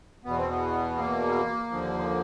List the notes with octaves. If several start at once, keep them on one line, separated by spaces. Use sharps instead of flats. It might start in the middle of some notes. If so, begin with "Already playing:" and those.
E2 B2 B3
C4
B3
A#3
D#2 D3 F3